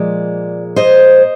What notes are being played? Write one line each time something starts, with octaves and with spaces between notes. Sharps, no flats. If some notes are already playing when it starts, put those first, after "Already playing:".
Already playing: A#2 F3 G#3 D5
C5 D#5